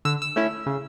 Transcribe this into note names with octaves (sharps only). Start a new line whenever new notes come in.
D3 E6
E6
A3 C#4 E4
C#3